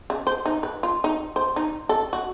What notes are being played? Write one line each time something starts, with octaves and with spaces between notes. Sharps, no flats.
C#3
C5
D#4
B4
F4
D#4
C5
D#4
A4
F#4